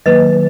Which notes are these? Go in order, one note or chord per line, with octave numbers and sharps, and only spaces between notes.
D#3 F#3 A#3 B4 D#5